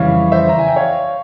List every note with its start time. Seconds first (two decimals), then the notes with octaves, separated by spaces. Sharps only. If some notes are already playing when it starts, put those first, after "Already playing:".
Already playing: F2 C#3 E3 G3 C#5 F5
0.32 C5 E5
0.49 A#5
0.59 G#5
0.68 G5
0.76 C#5 F5